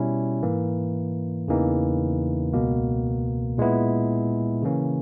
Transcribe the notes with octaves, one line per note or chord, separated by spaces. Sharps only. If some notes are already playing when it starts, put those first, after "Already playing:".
Already playing: B2 G3 C#4 E4
G#2 E3 A#3
E2 C#3 E3 A#3 D#4
C#2 B2 A#3
A#2 G#3 B3 E4
C#3 E3 A#3 C#4